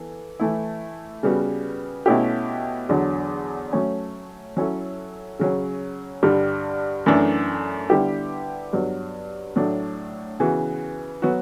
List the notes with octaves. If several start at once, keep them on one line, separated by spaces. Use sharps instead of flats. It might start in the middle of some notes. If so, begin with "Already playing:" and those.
Already playing: E3 B3 A4
E3 A3 E4
C#3 G3 B3 F#4
B2 A3 C#4 E4 G4
E2 D3 F#3
F#3 A3 C#4
F#3 C#4 E4 A4
C#3 F#3 C#4
G2 D3 G3
F#2 E3 A3 D4 A4
D3 G3 B3 E4 G4
G2 F#3 B3
A2 F#3 A3 D4
C#3 E3 B3 F#4
F#3 B3 F#4